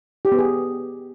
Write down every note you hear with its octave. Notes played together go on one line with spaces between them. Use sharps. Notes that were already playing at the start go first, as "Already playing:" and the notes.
G4
B3
G#4